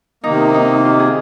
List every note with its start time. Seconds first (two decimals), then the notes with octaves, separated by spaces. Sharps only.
0.24 C3 D#3 A#3 D#4
0.54 D#4
0.85 F4
0.99 G#4